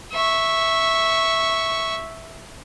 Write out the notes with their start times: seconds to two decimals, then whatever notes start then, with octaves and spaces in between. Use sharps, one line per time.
0.12 E5 C#6